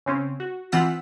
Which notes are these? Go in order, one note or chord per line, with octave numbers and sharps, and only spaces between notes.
C#3 C4 C#4
F#4
E3 C4 F4 F#5 E6 B6